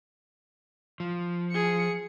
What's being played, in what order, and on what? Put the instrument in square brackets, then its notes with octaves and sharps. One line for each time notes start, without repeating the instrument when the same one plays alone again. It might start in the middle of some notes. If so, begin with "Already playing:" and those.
[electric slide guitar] F3
[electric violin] G#4 C#7